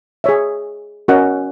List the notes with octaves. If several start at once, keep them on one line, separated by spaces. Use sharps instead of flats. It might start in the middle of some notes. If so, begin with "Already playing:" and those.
G#4 C#5 E5
C#4 F#4 A#4 D#5 F#5